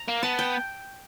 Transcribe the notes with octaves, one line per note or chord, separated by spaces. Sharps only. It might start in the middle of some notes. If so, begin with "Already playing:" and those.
Already playing: A#5
A#3
B3 A5
G5